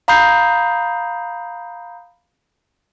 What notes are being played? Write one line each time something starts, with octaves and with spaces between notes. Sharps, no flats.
F5 A#5 B5 D#6 G6 C7